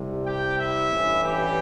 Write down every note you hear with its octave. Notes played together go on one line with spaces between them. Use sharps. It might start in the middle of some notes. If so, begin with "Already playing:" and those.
Already playing: C2 C3 G3
G4 G5
E4 E5
A1 G2 E3
G3 G4